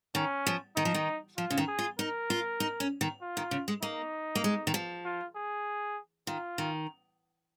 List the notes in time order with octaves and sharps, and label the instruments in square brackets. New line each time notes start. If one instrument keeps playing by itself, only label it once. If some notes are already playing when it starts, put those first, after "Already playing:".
[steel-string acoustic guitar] D#3 [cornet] C#4
[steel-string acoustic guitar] F3
[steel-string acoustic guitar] D#3 [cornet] D#4
[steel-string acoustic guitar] F3
D#3
[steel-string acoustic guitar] F3 [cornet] F4
[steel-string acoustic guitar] C#3
D#3
[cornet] G#4
[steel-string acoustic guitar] F4
[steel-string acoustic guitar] D#4 [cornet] A#4
[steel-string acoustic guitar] F4
D#4
C#4
D#3
[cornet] F4
[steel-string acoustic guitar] D#3
C#3
G#3
[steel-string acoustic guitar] A#3 [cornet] D#4
[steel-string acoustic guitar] A#3
G#3
D#3
F3
[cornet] F4
G#4
[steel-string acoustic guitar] D#3 [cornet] F4
[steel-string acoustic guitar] D#3